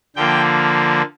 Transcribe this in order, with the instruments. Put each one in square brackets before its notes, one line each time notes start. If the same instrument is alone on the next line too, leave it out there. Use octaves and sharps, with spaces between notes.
[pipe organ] D3 F3 A#3 G5